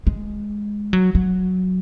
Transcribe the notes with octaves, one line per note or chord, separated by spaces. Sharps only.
G#3
F#3
F#3